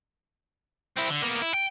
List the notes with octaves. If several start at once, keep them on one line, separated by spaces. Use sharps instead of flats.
C4 E4
D3
A#3 B3
E4
G5